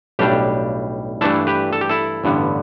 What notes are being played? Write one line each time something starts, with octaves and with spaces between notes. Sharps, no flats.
B1 A2 G3 D4 G4
G2 E3 A3 D4 E4 A4
G4 B4
A4
G4
E4 A4
A1 G2 D3 B3